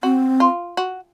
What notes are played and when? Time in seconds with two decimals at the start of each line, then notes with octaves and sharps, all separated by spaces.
0.03 C4 F#4
0.40 F4
0.77 F#4